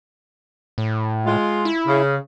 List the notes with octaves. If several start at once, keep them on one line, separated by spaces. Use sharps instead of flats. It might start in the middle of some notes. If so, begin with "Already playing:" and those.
A2
G#3 F4
E4
C#3